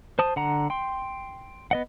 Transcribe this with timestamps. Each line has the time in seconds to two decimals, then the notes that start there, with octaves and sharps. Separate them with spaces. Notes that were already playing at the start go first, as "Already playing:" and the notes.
0.19 C5 A5 D#6
0.36 D3 F#5 A#5
0.70 G5 C6
1.71 B3 D#5 F#5